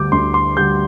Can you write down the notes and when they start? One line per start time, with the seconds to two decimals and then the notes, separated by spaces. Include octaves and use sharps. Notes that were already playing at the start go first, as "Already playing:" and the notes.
Already playing: D2 D3 G3 D6 G6
0.12 D2 C6
0.34 C6
0.57 D3 G3 G6